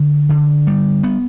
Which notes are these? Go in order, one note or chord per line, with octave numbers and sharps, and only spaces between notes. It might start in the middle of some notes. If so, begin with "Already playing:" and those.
Already playing: D3
D3
G3
B3